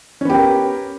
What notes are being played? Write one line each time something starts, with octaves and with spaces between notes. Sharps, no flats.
B3 C#4 G4 A#4